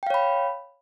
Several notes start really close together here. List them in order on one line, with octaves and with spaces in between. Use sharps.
G5 F5 C#5 B5